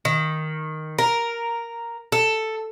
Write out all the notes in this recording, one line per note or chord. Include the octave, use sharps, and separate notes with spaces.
D#3
A#4
A4